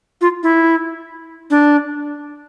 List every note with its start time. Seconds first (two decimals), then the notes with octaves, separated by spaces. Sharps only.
0.21 F4
0.43 E4
1.50 D4